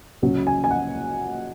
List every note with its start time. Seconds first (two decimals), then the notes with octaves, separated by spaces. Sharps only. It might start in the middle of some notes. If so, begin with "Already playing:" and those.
0.22 C#2 C#3 F#3 C#4
0.47 G#5
0.64 G#5
0.71 F#5